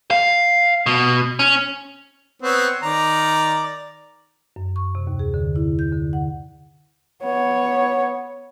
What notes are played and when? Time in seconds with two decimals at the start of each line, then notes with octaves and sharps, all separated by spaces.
0.11 F5
0.86 B2
1.39 C#4
2.42 B3 C4 C#5
2.83 D#3 D5 A#5
4.56 F#2
4.76 C#6
4.95 C3
5.07 D#2
5.19 G#4
5.34 D3
5.56 E4
5.79 G6
5.93 D3
6.13 F#5
7.24 B3 C#5